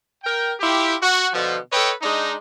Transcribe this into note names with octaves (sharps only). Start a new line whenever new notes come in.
A#4 G5
E4 F4 G4
F#4
B2 D3 F3
A4 B4 C#5 D#5 G5
G#3 D4 D#4